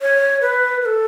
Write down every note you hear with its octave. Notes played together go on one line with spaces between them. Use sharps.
C#5
B4
B4
A4